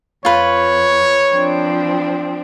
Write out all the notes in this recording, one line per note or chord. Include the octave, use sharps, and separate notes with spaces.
F2 F4 B4 C#5
F3 C4 D4